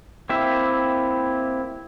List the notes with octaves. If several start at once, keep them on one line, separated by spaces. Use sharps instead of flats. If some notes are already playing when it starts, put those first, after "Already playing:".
A#3 C4 E4 G4 E5